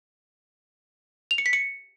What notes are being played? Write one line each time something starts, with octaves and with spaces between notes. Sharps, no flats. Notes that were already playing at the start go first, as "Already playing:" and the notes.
F7
C#7
B6
C#7